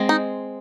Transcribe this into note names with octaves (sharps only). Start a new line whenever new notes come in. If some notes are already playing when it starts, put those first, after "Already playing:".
Already playing: G#3 C4
D#4